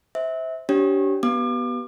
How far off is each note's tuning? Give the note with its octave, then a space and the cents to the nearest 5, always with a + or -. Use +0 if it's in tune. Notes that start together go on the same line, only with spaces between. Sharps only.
C5 +0 E5 -25
D4 -35 G4 -25 C#5 -25
B3 -10 G4 -35 D6 +35